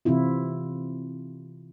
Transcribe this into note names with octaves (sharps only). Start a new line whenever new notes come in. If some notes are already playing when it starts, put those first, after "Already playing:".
C3 E3 C4 E4 F4